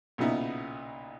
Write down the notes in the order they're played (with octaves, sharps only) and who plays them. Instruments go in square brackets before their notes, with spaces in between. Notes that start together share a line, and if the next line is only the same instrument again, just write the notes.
[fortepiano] B1 A#2 C#3 B3 D#4 E4